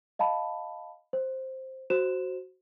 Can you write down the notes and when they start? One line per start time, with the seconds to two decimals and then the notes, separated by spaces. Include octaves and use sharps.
0.19 D#5 F5 A5 B5
1.13 C5
1.90 F#4 C5 E7